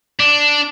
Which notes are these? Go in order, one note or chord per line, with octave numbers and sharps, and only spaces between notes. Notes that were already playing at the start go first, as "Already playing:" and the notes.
D4